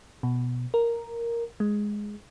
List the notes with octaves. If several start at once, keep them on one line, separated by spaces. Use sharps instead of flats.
B2
A#4
G#3